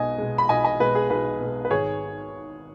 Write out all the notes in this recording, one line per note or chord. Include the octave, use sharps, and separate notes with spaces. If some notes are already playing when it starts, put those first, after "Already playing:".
Already playing: B1 B2 G#3 D#5 G#5
B2 G#3
B5
B1 D#5 G#5
D#5 G#5
B2 G#3 B4
G#4
B1 B4
B2 G#3
B4
G#1 G#4 C#5